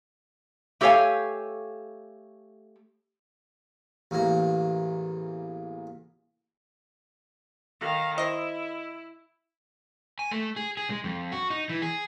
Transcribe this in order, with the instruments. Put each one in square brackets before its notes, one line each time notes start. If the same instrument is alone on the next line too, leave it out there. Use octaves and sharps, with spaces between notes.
[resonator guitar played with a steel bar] A3 G4 A4 C#5 F5 G#5
[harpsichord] A1 E2 A#3
[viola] D#3 F5
[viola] E4 [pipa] C5 D#5
[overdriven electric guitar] G#5
A3
G#4
G#4
G#3
F2
F#4
D#4
E3
G#4